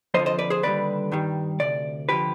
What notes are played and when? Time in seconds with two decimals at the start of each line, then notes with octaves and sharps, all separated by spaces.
0.14 F2 D3 F3 C5 D#5
0.26 C5 D#5
0.39 B4 D5
0.50 G#4 C5
0.63 D#2 D3 G3 B4 D5
1.12 G2 D#3 G3
1.60 D2 C3 D5
2.09 D3 F3 G4 B4